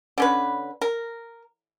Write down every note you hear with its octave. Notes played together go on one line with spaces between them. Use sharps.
D3 C#4 B4
A#4